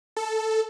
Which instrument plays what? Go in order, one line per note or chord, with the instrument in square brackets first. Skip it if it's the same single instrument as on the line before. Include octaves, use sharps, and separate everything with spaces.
[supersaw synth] A4